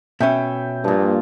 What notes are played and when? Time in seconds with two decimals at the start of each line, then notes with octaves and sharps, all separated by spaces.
0.21 B2 C#4 E5 G5
0.84 G2 A#2 F3